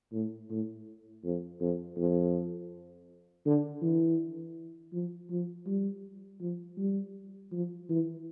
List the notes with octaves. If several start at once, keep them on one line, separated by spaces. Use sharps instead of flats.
A2
A2
F2
F2
F2
D3
E3
F3
F3
G3
F3
G3
F3
E3